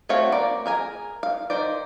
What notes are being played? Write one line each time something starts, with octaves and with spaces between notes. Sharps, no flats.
A3 C4 F#4 C#5 F5
A#3 D5
G#4 A#4 G#5
F5
D#3 C5 D5